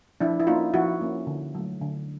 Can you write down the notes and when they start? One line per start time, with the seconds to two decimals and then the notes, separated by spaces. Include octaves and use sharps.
0.20 F3 D4 E4
0.40 E4
0.47 A#3 C#4 D#4 F4
0.74 F3 E4 F#4
1.01 A#3 C#4
1.27 D3
1.55 F#3 A3
1.81 D3